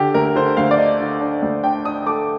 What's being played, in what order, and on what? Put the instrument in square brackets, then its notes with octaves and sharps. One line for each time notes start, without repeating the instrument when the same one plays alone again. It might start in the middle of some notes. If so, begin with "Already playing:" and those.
Already playing: [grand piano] D3 G4
D2 A#4
D3 C5
D2 F5
D5
D4 D#5
D3
D4
D2
D4 G5
D4 D#6
A3 D6